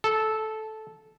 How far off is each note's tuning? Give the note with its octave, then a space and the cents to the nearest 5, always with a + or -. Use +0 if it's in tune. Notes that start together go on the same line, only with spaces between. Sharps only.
A4 -10